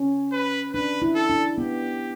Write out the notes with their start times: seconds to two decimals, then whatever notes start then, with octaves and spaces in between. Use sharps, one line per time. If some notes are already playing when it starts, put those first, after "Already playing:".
Already playing: C#4
0.32 B4
0.73 D4 B4
1.02 E4
1.15 A4
1.30 D4
1.58 B3 G4